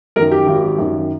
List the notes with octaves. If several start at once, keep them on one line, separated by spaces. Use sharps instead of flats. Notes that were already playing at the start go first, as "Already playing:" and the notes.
F#2 D#3 A#4
G4
G#1
F#2 D#3